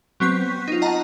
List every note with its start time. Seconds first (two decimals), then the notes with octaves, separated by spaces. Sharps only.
0.20 F#3 B3 C4 C#6 B6
0.68 D#4 F4
0.82 D#5 F#5 A5 A#5